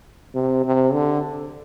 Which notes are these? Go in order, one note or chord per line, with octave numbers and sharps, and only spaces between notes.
C3
C3
D3